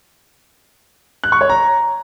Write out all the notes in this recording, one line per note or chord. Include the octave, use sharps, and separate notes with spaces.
F#6
C#6
C#5
A#5